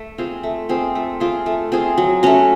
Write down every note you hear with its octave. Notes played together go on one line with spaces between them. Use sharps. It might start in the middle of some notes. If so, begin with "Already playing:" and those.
Already playing: A3
C4 F4 G#4
A3
C4 F4 G#4
A3
C4 F4 G#4
A3
C4 F4 G#4
F#3
A3 C#4 F#4